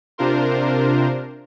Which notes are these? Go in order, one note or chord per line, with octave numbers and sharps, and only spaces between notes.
C3 D4 F4 A#4 C5